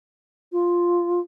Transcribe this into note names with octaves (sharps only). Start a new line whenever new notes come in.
F4